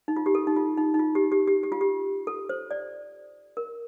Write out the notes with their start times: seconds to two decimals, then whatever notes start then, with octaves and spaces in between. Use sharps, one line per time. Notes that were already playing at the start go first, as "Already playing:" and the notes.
0.08 D#4
0.17 F4
0.26 G4
0.35 A4
0.47 D#4
0.56 F4
0.77 D#4
0.94 D#4
0.99 F4
1.15 G4
1.32 G4
1.48 G4
1.63 G4
1.72 F4
1.81 G4
2.27 A4
2.49 C5
2.71 D5
3.57 A#4